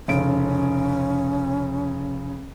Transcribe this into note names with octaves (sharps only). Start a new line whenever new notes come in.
F1 C#3 C#4 D7